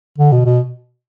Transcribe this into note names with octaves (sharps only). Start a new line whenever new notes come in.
D3
B2
B2